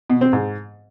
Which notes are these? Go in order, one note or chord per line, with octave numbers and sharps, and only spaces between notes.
B2
C4
G#2